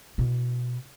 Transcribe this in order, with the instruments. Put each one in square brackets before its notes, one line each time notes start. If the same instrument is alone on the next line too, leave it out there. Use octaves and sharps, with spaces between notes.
[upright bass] B2 E4